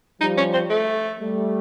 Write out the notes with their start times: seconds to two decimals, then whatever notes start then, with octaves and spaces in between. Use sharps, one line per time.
0.21 F3 G3 D#4
0.37 C#4
0.53 C4
0.70 A3
1.20 G3 A3